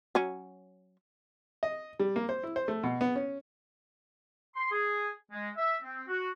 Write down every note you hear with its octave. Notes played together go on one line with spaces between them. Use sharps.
F#3 C#4
D#5
G3
A#3
C5
E4
C5
A3
B2
B3
C#4
C6
G#4
G#3
E5
C4
F#4